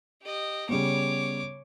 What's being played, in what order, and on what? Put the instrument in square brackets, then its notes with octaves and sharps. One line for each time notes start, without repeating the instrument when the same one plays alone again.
[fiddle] G4 D#5
[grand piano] C#3 G3 B3 [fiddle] C#5 D6